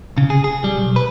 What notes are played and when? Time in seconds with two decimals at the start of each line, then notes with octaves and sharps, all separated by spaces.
0.18 C#3
0.30 G#4
0.44 G#4
0.64 G3
0.77 B1
0.96 B4